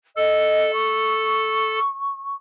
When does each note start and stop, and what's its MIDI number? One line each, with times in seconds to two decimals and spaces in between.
0.16 1.79 69
0.16 0.71 75
0.73 2.35 85